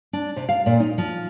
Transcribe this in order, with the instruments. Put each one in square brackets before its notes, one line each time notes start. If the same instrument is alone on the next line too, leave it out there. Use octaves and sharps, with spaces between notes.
[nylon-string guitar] D4
C3
F5
A#2
D#4
F3